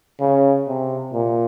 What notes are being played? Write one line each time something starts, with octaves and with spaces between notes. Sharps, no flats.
C#3
C3
A#2